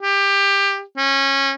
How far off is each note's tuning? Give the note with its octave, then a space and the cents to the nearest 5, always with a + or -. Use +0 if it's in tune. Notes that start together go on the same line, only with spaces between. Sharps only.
G4 +20
C#4 -20